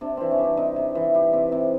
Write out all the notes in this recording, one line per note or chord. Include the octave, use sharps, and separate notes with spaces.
C3 D4
E3 C4
C#4
G3
D4
C3 D#4
C3
E3
G3
C3
C3